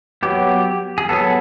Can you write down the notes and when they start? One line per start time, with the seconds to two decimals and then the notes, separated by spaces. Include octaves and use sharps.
0.23 F#3 B3 G4
0.98 G#4
1.09 F#3 B3 A4